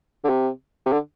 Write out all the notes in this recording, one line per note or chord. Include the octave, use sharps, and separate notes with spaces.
D3
C3
C3
D3